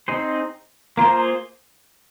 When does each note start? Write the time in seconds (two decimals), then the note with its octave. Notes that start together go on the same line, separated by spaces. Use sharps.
0.08 C4 D#4 G#4 C5
0.97 A#3 F4 G#4 C5 A#5